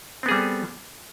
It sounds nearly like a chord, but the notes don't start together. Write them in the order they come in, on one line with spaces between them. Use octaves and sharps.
C4 B3 G#4 G3 A4